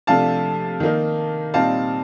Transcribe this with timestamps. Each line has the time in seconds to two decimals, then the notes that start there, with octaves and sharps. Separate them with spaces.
0.07 C3 F3 A3 D4 F5 A5
0.80 D#3 A#3 D#4
1.54 A#2 G3 C4 D#4 F5 A5